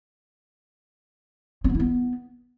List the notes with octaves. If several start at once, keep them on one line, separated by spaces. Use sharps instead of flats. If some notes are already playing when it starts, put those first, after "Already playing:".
C4
B3
E4
B3